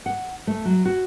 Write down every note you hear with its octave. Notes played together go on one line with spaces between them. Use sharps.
F#5
A3
F#3
F#4